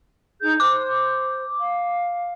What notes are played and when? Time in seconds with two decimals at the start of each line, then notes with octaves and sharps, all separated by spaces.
0.41 D#4 G#4 G6
0.60 C5 D6
1.60 F5